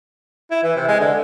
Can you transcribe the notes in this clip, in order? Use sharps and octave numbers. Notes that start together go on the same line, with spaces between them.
E4
E3
C3
G#3
D3